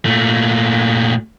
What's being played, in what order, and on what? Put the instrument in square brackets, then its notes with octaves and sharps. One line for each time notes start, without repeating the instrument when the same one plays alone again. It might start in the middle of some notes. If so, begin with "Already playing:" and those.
[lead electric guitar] A#2 A3